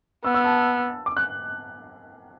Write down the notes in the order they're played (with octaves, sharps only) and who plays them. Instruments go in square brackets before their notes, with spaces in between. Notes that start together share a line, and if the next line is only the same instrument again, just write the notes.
[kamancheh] B3 [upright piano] E6
[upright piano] E6
A5
D6
F#6